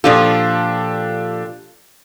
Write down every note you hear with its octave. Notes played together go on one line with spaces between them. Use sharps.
A#2 F3 D4 F4 G4 A4